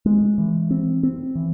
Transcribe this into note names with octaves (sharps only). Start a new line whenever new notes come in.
G#3
E3
C4
C4
E3